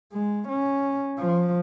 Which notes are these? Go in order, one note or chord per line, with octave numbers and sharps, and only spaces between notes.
G#3
C#4
F3